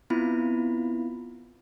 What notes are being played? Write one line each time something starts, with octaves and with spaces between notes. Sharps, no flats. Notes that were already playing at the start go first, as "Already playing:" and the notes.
B3 C4 E4 F4 B5